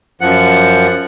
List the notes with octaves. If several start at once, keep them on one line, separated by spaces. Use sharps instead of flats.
F#2 F3 F#5